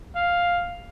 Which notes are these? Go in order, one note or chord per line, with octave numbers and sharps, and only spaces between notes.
F5